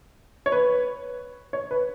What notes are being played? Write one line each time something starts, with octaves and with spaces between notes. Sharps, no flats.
C#5
B4
C#5
B4